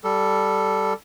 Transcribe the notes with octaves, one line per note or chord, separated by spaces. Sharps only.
G3 A4